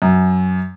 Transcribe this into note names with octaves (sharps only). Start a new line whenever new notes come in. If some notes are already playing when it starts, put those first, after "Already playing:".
F#2